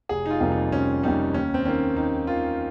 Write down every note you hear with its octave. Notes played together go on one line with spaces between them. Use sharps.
F1 G#4
D#4
F4
F2 C3 G3 A#3
D#4
F1 C#4
F2 C3 G3 A#3 D#4
D#2 C#4
C4
D#3 A#3 C#4
D#2 D#4
D#3 A#3 F4